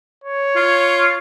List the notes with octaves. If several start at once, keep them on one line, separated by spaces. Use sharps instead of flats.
C#5
F4